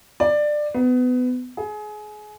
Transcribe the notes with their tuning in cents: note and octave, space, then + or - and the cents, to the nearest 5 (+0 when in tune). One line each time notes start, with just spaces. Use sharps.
D5 +15
B3 +25
G#4 +25